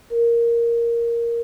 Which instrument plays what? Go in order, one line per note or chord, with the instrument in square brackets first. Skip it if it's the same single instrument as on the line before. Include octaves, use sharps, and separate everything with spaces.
[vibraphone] A#4